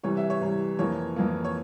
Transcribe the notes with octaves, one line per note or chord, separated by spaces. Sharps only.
C2 C3 E3 G3 C#5
E5
C#5
C2 C3 E3 G3
F2 E3 A#3 C#5
F2 E3 A#3
C#5